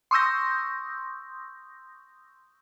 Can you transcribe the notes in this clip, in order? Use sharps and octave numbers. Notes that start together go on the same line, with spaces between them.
C6 C#6 D#6 E6 G6 A#6